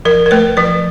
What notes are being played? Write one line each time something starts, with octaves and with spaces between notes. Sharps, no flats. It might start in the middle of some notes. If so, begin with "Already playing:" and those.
F3 A#4
A#4
A3 B4
F3 B4